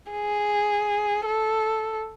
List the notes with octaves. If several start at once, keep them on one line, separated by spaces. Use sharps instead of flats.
G#4
A4